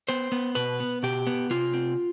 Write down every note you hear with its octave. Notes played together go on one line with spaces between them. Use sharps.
B3 C5
B3
B2 B4
B3
B2 G4
B3
C3 F4
C4